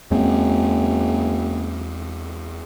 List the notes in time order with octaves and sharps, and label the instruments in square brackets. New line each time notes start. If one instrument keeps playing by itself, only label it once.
[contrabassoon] F#1 [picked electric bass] E2 G#3 C4